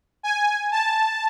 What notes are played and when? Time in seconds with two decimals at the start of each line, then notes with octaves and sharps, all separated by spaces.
0.23 G#5
0.71 A5